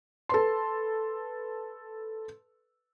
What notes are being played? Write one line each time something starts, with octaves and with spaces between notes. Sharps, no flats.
A4 B4 C6